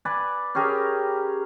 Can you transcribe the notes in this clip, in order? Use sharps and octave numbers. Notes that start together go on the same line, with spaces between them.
B4 D5 G#5
C#4 G4 G#4 A#4